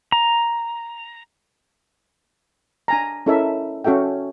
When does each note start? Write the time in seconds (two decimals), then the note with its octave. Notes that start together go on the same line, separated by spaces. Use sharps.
0.12 A#5
2.88 D4 G#5 A#5
3.26 C#4 E4 A4 A#4 D#5 E5
3.84 C#4 F#4 A4 E5 G5